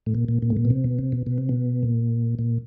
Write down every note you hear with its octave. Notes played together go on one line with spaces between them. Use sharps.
A2
A#2
A#2
A#2
A2
A#2
B2
C3
B2
C3
B2
B2
C3
B2
A#2
A#2